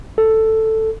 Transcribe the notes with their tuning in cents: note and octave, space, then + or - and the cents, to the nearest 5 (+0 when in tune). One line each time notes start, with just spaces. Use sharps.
A4 +5